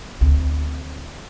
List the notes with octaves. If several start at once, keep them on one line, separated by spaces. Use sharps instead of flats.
D2 C4